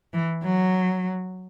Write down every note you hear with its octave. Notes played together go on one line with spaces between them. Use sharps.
E3
F#3